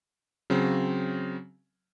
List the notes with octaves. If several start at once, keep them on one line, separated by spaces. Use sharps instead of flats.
C#3 F#3 C4